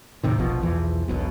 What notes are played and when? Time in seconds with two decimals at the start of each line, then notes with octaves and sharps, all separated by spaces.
0.24 D#2 A2 C3 D#3
0.38 F1 A#1 B2 F3
0.62 B1 E2 E3 F3
1.08 E1 B1 B2